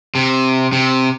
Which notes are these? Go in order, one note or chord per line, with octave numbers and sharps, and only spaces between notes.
C3
C3